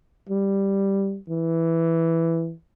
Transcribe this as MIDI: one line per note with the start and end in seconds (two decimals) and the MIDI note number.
0.29 1.18 55
1.30 2.53 52